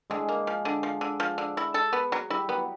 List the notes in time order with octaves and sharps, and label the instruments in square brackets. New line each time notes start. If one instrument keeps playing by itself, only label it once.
[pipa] D3 [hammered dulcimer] G#3 G#4
[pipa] A#3
F3
D3
F3
D3
F3
D3
E4
A4
B3
F#3
[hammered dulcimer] G3 G4 [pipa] E4
[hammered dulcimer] F#3 F#4 [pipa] B3